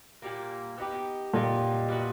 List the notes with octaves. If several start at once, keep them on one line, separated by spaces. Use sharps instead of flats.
A#2 G3 A#3
B3 D#4 G4
A#2 B3 D#4 G4
G3 B3 D#4 F#4